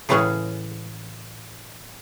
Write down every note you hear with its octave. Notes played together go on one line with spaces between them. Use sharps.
A2 C#3 E3 G#3 C#4 G#4